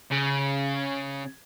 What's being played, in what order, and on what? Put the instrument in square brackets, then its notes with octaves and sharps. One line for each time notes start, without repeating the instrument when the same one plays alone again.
[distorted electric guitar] C#3